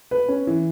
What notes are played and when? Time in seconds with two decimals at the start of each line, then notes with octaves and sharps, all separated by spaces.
0.11 B4
0.28 C#4
0.47 E3